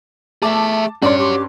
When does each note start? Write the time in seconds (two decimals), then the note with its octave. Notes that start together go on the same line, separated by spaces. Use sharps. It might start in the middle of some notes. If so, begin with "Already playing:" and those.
0.42 A3 G#4 E5 A5 D6
1.02 G2 C#4 F#4 C#5 D5 C6
1.19 G4